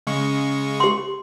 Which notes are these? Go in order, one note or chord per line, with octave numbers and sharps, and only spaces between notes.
C#3 G#3 C#6
G4 C6